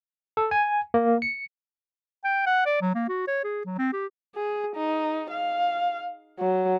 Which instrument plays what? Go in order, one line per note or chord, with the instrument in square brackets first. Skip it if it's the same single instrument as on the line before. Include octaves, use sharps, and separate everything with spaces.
[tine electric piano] A4
G#5
A#3
C#7
[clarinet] G5
F#5
D5
F#3
A#3
F#4
C#5
G#4
F#3
C4
G4
[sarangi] G#4
D#4
F5
F#3